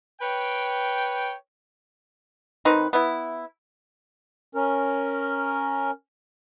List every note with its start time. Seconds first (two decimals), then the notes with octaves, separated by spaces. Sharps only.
0.21 B4 C#5 G5
2.65 D#3 C4 D#4 B4
2.93 B3 E4
4.55 C#4 A#4